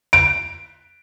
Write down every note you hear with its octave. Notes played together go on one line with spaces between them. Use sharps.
D7